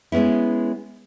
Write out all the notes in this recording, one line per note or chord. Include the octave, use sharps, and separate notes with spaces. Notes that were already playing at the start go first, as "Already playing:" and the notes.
G#3 B3 C#4 E4